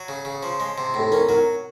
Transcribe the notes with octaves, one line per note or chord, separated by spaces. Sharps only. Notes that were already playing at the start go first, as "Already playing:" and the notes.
Already playing: F#3
C#3
C#3
F3
G#3
C3
A2 A4
C#4 A#4
F#3 A#4